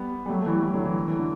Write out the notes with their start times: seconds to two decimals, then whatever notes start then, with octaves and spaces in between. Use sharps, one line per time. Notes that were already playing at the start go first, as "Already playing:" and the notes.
Already playing: G3 B3
0.26 G3
0.29 F#3 A3
0.41 A3
0.46 E3 G3
0.63 E3 G3
0.74 D3 F#3
0.85 E3
1.08 E3
1.19 D3